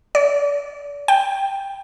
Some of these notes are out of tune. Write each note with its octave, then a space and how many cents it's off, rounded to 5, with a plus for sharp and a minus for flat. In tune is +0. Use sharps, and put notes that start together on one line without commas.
D5 -35
G5 +5